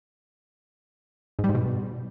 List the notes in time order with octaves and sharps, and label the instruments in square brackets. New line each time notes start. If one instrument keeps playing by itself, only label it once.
[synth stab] G#2
G3
G#2
B2